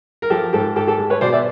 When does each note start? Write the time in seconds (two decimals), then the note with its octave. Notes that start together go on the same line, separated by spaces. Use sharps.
0.22 A#4
0.30 F3 G4 A4
0.53 G#2 G4 A4
0.76 G#2 G4 A4
0.87 G4 A4
0.98 G#3
1.10 B4 C#5
1.21 B2 C5 D5
1.32 D5 E5